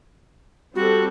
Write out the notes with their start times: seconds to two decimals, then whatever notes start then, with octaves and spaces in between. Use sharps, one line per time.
0.75 G3 C4 F#4 A4